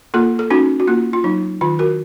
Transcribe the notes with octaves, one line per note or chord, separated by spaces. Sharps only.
A#3 F4 A4
A4
C#4 D#4 F#4
F#4
A#3 F4
F4
F#3 D#4
D#3 F4
F#4 A#4